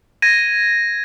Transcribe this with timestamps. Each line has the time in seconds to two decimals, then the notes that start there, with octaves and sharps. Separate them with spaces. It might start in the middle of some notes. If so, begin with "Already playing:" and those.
0.22 G#6 A#6 D#7